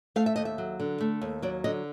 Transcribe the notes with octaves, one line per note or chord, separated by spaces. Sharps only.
A3 F5
E5
D#2 D#5
E5
F#3
D3
A3
D#2
F#3 D5
D3 D#5